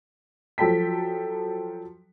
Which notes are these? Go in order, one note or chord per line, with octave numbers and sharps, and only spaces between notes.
F3 F#3 A4 G5 A5 B6